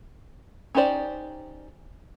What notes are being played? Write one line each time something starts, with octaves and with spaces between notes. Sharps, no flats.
C#4 D#4 G4 C5 D5